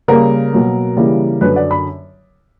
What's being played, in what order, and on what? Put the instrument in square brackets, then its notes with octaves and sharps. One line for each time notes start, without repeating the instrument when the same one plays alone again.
[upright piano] C#3 G3 A#3 A#4
B2 F#3 A#3
C#3 E3 G3 A#3
F#2 D3 F#3 B4
D5
B5